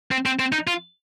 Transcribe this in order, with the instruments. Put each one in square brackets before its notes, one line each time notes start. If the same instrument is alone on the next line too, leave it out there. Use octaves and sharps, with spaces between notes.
[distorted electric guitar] C4
C4
C4
D#4
F4